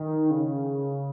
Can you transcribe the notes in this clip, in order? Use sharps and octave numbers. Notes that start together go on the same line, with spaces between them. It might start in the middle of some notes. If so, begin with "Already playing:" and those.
Already playing: D#3
C#3